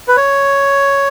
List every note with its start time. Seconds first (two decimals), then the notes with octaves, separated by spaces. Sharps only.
0.08 B4
0.17 C#5